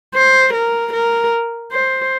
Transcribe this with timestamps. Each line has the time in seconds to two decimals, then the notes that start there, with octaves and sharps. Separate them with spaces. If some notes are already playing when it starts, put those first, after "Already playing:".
0.14 C5
0.54 A#4
0.93 A#4
1.72 C5